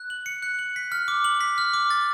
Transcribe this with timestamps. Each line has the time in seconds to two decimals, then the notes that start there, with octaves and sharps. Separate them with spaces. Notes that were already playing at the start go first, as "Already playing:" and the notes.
Already playing: F#6
0.10 F#7
0.26 C#7
0.42 F#6
0.59 F#7
0.76 B6
0.92 F6
1.08 D6
1.24 F#7
1.41 B6
1.58 F6
1.73 D6
1.90 A6